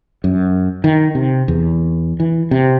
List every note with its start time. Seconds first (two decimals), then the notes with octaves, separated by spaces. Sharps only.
0.24 F#2
0.84 D#3
1.15 C3
1.48 E2
2.20 E3
2.51 C3